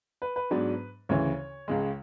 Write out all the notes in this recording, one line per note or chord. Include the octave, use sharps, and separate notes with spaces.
B4
B4
G#2 F#3 B3 D4
D2 C#3 E3 C#5
C#2 C#3 G#3